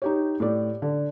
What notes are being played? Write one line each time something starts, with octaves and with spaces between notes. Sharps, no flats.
D#4 G4 C#5
A2 G4 D5
D3